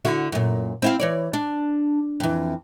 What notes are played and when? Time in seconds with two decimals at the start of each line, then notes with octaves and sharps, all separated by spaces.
0.05 D3 E4 F#4
0.32 F#2 A#2
0.82 C4 E4 F5
1.00 E3 C#5 D5
1.33 D4
2.20 F2 E3